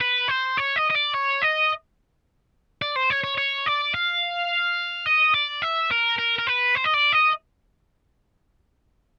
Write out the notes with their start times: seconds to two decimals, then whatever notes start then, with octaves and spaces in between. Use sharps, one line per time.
0.01 B4
0.29 C5
0.58 C#5
0.76 D#5
0.90 D#5
0.95 D5
1.13 C#5
1.42 D#5
2.82 D5
2.96 C5
3.10 C#5
3.24 C#5
3.38 C#5
3.66 D5
3.94 F5
5.06 D#5
5.34 D5
5.62 E5
5.91 A#4
6.18 A#4
6.38 A#4
6.47 B4
6.75 C5
6.84 D#5
6.94 D5
7.12 D#5